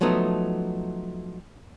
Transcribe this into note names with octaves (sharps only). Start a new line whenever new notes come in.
F3 F#3 A3 B3 D#4